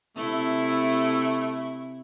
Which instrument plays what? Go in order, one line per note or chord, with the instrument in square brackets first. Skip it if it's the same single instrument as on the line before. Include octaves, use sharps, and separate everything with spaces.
[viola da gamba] C3 E4 [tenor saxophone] A3